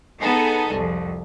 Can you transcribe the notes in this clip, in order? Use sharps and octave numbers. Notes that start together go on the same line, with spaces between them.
B3 D#4 G#4 A4
C2 F2